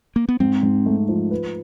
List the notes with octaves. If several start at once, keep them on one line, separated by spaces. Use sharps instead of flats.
A#3
B3
G#2 C4
G#2
A3
F3
B4